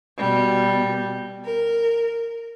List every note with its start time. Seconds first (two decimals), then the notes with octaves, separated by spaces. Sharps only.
0.17 B2 G3
1.44 A#4